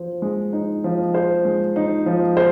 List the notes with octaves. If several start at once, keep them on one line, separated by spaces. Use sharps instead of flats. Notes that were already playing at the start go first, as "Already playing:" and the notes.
Already playing: F3 C5
G#3
D#4
F3
C5
G#3
D#4
F3
C5